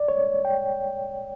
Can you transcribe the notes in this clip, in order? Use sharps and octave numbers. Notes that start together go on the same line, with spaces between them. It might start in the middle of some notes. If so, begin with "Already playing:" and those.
Already playing: D5
C#5
G5